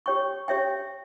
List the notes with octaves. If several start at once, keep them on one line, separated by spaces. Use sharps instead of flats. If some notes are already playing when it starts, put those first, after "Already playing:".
G4 C#5 G5 C#6
G4 C#5 E5 G5